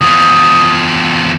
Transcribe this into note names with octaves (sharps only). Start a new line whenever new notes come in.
E2 F3 D#6